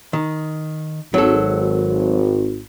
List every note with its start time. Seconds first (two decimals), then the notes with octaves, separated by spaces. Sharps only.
0.13 D#3
1.14 G#1 F#3 A4